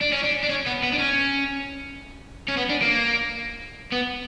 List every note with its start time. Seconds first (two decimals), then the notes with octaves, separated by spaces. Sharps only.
0.01 D4
0.12 C#4
0.23 D4
0.43 D4
0.49 C#4
0.66 B3
0.83 B3
0.92 D4
0.98 C#4
2.48 C#4
2.57 B3
2.69 D4
2.82 A#3
3.92 B3